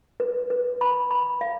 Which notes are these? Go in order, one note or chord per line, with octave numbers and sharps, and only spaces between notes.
B4
B4
B5
B5
F5